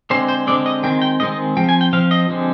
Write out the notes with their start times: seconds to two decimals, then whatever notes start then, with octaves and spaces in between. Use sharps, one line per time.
0.10 D3 G#3 C4 C5
0.28 C5
0.47 D3 G#3 C4 D5
0.66 D#5
0.83 D#3 G#3 C4 G5
1.02 G5
1.20 D#3 G#3 C4 D#5
1.32 D#5
1.57 F3 C4 G5
1.69 G#5
1.81 G5
1.93 F3 C4 F5
2.11 D#5
2.29 D3 F3 G#3 C4